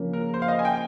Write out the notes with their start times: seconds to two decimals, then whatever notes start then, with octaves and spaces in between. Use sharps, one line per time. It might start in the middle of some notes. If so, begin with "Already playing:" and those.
Already playing: C#3 F3 A#3 C#4
0.13 A#4
0.34 C5
0.42 F5
0.48 D#5
0.59 G#5
0.65 G5